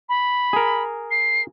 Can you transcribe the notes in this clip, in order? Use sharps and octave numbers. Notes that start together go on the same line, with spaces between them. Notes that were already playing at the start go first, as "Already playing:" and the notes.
B5
G#4 A#4
C7